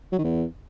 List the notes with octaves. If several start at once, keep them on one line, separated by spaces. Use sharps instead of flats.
F#3
D#3
E2